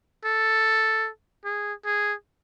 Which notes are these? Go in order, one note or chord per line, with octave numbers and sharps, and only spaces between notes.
A4
G#4
G#4